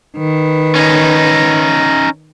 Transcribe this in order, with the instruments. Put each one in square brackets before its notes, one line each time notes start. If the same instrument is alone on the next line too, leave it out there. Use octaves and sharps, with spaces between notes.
[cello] D#3 B4
[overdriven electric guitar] C#4 D#4